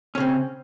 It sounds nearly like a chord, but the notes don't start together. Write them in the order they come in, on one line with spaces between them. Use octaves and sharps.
C#4 C#3 C4